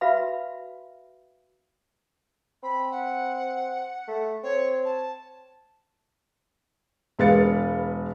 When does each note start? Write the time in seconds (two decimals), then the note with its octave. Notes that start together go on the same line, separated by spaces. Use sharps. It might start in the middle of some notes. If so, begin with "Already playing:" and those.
0.01 F#4 B4 E5 F5 B5
2.63 C4 B5
2.91 F#5
4.08 A3
4.43 C4 C#5
4.85 A5
7.19 E1 G#3 B4 F5 A6 C#7